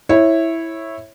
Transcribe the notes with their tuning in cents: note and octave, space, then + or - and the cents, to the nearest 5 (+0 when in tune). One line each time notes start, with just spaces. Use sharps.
E4 -5 C#5 -15